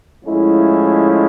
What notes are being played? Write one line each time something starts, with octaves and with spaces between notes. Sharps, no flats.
A2 F3 G#3 C#4 E4